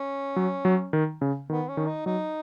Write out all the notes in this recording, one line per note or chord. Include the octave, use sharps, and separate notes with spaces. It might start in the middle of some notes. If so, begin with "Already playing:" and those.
Already playing: C#4
F#3
F#3
D#3
C#3
D#3 B3
C#4
D#3
D#4
F#3 D#4